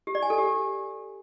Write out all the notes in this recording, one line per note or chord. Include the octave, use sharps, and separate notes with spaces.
G4
D5
G#5
A4
G4